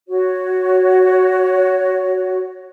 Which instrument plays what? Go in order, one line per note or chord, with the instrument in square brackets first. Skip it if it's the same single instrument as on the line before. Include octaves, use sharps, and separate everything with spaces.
[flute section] F#4 C#5